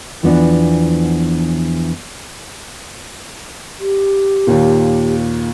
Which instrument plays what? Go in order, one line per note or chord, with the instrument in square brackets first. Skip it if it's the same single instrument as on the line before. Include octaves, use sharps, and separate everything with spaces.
[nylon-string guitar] E2 E3 F3 B3 D4 F#5
[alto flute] G4
[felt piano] D#2 A#2